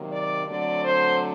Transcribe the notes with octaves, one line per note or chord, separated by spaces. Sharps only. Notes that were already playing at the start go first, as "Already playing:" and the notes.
Already playing: C3 D#3 F#3 A#3
D5
D3 F#3 A3 C4 D5
C5